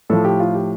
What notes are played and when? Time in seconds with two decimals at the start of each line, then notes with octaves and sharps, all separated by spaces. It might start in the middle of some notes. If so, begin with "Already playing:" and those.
0.10 A2 F3 A4
0.25 G4
0.40 F4
0.55 G4